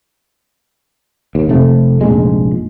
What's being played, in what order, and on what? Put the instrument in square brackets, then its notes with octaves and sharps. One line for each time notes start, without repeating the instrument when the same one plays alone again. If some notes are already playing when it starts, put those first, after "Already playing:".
[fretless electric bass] D#2
F1 C3 A3
F1 A#1 A#2 G#3